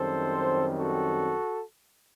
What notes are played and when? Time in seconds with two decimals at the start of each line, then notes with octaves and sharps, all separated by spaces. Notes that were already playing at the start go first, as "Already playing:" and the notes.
Already playing: F#2 D#3 G3 C4 A4 C5
0.77 F#4 A4